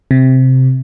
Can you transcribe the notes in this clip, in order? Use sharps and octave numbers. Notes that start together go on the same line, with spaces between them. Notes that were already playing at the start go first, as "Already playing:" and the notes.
C3